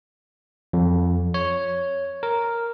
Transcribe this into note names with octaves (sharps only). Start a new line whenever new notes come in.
F2
C#5
A#4